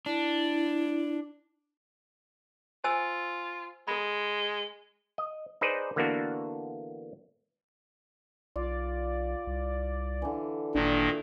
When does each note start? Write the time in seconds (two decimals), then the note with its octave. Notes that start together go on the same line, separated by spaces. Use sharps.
0.06 D4 E4
2.84 F4 C5 G#5 E6
3.88 G#3 A4 B5
5.18 D#5
5.61 D#4 G#4 B4 C5 D5
5.96 D3 E3 A#3 B3 D4 F#4
8.56 B1 F4 D5
9.47 C2
10.22 D3 E3
10.75 G#1 A#2 D#3 A#3 D4